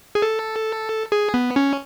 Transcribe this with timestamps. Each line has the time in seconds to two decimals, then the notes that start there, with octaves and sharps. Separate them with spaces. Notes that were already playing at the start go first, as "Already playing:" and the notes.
0.15 G#4
0.22 A4
1.12 G#4
1.34 B3
1.56 C#4